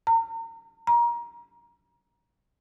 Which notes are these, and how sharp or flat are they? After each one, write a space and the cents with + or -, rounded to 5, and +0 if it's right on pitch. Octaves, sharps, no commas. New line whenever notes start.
A#5 -40
A#5 +25